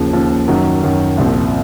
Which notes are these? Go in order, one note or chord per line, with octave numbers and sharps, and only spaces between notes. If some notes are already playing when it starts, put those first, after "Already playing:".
Already playing: D#2 C#3 F3
D#2 C#3 F3
F#2 D#3 F#3
F#2 D#3 F#3
C2 A#2 F3 C4